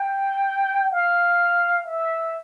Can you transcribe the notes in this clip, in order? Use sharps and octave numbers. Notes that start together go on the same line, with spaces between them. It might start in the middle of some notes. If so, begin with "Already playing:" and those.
Already playing: G5
F5
E5